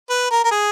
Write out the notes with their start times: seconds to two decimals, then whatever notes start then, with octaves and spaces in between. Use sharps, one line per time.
0.10 B4
0.31 A#4
0.44 A#4
0.51 G#4